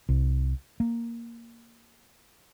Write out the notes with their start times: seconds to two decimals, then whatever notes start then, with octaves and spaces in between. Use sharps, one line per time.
0.09 C2
0.80 A#3